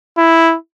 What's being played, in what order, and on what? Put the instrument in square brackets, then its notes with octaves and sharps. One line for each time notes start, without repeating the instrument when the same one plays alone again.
[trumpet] E4